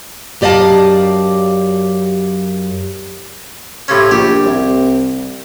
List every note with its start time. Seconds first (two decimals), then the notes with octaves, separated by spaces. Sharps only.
0.41 F#2 G4 D5 D#5 F5 A5
3.88 A2 C3 C#4
4.11 A#1 G4
4.46 C2